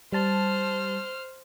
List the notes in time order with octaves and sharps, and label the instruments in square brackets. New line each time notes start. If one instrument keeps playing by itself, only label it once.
[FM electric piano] G3 A5 [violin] C5 F6